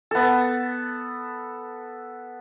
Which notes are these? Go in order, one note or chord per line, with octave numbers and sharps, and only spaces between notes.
B3 A4